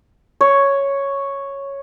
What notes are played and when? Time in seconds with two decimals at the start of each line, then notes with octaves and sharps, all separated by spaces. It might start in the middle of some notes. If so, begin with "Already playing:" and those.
0.41 C#5